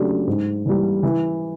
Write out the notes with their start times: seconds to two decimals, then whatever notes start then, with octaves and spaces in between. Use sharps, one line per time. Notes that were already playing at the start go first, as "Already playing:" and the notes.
Already playing: C#3 F#3 A3 D4 G4
0.27 G#2
0.66 E3 G3
1.03 E3